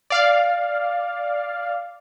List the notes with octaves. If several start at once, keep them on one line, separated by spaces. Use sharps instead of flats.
D5 F5